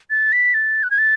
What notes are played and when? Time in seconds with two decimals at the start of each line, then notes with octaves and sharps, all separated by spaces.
0.10 A6
0.33 B6
0.54 A6
0.83 F#6
0.91 G#6
0.98 A6